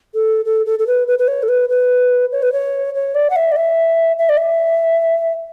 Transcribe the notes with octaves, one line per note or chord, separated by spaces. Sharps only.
A4
A4
A4
A4
B4
B4
B4
C#5
A4
B4
B4
C#5
B4
C#5
C#5
D5
F#5
E5
D5
E5
E5
D5
E5